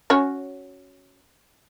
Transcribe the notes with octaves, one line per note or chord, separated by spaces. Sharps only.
C#4 F#4 C#5